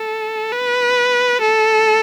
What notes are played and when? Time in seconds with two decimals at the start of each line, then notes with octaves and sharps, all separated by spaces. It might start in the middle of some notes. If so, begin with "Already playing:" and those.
Already playing: A4
0.52 B4
1.41 A4